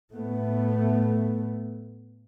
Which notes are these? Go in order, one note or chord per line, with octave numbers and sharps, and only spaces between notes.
A2 A3 B3